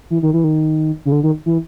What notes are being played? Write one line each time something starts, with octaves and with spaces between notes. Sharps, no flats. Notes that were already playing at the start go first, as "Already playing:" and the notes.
E3
D#3
E3
D#3
C#3
D3
D#3
E3